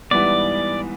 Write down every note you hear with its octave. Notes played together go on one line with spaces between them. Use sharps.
G#2 E3 G3 B3 D5